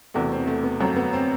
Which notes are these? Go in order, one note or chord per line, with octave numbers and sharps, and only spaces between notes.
E1 E2 C3 E3 A3 F#4
C4
A3
B3
G1 F#2 F#3 A3 C4
B3
C4